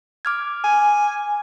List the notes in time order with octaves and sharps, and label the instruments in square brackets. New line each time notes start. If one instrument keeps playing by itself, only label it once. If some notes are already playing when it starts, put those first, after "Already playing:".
[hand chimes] D6 F6 G#6
[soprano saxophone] G#5